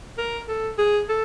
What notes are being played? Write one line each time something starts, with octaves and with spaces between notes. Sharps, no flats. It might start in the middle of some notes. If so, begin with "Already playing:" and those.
A#4
A4
G#4
A4